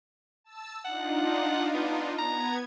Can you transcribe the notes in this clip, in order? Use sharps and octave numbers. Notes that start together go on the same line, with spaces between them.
A5 E6
D4 D#4 F4 F#5
B3
B3 A#5 G#6